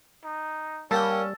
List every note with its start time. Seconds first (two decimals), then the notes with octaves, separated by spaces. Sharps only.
0.24 D#4
0.91 G3 A#3 C#4 F#5 G5 A5 E6 A6